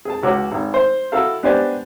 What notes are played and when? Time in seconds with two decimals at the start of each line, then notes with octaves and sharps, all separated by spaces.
0.05 G#4 A5
0.23 C#2 F#4 C#5 D6
0.52 G#1
0.74 C5
1.12 E4 F#4 A4 F5
1.43 B3 D4 G4 C5 D5 G#5